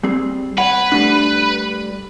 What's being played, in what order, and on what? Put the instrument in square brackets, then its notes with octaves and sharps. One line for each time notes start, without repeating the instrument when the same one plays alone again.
[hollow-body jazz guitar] G3 C4 G#4
[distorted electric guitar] B4 [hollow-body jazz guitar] C#5 F#5
[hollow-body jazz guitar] G3 A3 D4